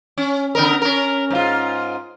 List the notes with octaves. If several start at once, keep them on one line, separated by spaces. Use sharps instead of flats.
C#4
D3 B3 A#4
C#4 A#4
G#2 F4